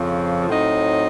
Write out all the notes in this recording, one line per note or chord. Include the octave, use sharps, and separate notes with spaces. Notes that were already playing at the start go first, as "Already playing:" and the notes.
Already playing: F2 C#3 F3
A2 F#3 C4 D#4